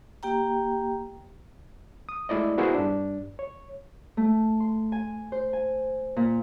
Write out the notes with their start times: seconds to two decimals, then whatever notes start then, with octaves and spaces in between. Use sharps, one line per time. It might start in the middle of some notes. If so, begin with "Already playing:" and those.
0.23 A#3 G4 G5 A#5
2.09 D#6
2.29 G#3 A3 E4 D5 D#5
2.58 B3 E4 F#4 G#4 A#4 C5
2.74 G2 D4
3.39 C#5
4.17 A3
4.60 C6
4.92 G#5
5.32 C5
5.53 G#5
6.16 A#2